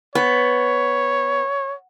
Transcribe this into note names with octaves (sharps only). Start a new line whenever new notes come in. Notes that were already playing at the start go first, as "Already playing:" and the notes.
B3 C#5